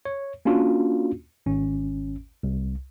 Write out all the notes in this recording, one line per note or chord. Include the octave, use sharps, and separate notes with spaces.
C#5
A#3 C#4 D4 F4 F#4
G#1 C#4
C2